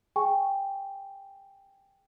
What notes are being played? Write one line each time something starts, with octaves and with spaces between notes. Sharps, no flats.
G#4 G5 G#5 C#6